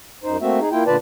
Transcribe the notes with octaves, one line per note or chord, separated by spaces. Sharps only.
F#2 D#4 C5
A3 A#3 C4 F#4 E5
D#4 G#4
A#3 E4 F4 G5
A#2 D3 F4 B4 D5 A5